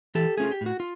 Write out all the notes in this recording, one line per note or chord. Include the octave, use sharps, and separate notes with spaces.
E3 G4 A4
A3 C#4 F4 G#4
G4
A2
F#4
F4